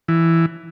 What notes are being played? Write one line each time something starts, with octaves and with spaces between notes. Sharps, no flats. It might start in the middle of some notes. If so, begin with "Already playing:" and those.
E3